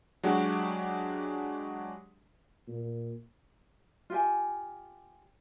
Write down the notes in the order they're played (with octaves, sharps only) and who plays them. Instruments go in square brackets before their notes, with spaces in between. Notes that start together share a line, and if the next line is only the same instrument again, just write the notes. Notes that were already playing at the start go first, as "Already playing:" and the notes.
[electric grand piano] F#3 G#3 D4 F#4 G4
[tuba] A#2
[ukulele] F4 G4 G#5